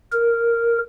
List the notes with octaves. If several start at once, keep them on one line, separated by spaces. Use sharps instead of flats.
A#4